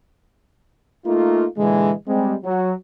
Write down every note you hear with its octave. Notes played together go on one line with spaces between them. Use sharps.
A3 A#3 D#4 F4
A#2 D3 E3 G#3
G3 G#3 C4
F#3